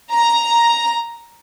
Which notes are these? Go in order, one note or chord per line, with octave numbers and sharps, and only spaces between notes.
A#5